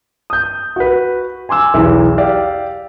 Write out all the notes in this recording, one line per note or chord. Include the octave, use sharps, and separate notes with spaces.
D#6 G6
F#4 B4
G#5 C6 D6 E6
B1 E2 E3
G4 D5 F5